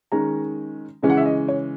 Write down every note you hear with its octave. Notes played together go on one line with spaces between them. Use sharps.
D#3 G#3 C#4 A#5
C#3 E3 G#3 C#4
F#5
E5
D#5
C#5